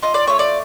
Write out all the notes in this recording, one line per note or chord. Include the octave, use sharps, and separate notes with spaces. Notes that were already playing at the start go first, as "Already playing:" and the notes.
F4 D#5
D5
A3 C#5
D5